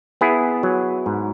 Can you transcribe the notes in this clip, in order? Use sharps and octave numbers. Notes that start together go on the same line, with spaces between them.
B3 E4 G#4
F#3
G#2